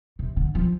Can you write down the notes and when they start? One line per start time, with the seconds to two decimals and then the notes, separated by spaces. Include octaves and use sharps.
0.19 C3
0.37 D3
0.55 F3